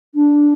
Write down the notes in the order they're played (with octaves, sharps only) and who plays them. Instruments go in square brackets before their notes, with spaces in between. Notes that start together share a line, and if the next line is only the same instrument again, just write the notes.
[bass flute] D4